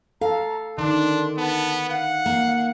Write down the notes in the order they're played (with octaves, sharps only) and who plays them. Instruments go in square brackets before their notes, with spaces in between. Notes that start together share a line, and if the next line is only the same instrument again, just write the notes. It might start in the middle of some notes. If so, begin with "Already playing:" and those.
[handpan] A4 [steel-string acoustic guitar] F5 [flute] A#5
[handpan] D3 D#3 [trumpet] D4 [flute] C6
[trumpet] B3 [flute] A5
[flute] F5 [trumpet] F#5
[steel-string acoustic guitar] A#3